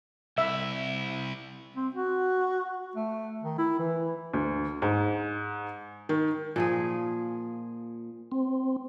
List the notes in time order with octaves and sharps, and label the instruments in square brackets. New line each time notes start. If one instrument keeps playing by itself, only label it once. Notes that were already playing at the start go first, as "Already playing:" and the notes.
[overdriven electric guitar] C2 E4 [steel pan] E5
[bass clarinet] C4
F#4
A3
D#3
E4
E3
[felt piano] D2
G#2
D#3
[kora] A#2 F3 G#4
[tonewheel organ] C4